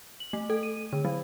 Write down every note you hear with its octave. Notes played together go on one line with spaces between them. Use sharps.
F#7
A3
A4
D#7
D3
F#3